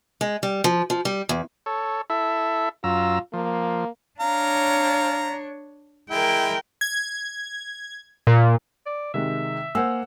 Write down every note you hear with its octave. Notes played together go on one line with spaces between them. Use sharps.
G#3
G3
F3
F3
G3
E2
A4 C#5
E4 A4 E5
F#2 F4 A#5 E6
F3 A#3
D4 C#5 F5 A#5
G#3 E4 A#4 G5
G#6
A#2
D5
C3 D#3 G#3 E5
A#3 C5 F#5 G#5 E6